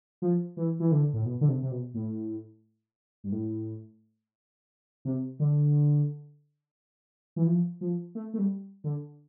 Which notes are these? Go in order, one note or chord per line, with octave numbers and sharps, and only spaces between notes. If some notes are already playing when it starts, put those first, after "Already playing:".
F3
E3
E3
D3
A2
B2
D3
C3
C3
B2
A2
G2
A2
C3
D3
E3
F3
F3
A3
A3
G3
D3